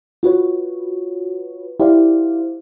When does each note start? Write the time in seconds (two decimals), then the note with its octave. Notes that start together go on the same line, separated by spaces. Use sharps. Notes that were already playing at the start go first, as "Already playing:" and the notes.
0.23 F4 F#4 B4 C#5
1.80 E4 G4 C5 D5 F5